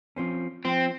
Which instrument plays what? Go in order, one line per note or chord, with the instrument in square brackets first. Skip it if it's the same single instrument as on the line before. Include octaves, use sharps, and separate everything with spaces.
[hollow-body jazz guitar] F3 C4 C#4
[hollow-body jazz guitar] F3 [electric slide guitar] C4